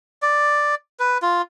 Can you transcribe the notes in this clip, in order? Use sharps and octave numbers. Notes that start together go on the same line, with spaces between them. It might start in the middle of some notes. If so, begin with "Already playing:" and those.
D5
B4
F4